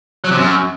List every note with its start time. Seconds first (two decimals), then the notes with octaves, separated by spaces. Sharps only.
0.24 F#3
0.31 C3
0.37 F#2